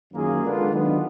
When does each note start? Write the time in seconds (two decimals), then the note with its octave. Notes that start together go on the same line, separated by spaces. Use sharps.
0.14 F#2 D#3 A#3 F4 G#4
0.43 D3 G#3 B3 D4 F4
0.70 D#3 F#3 B3 D4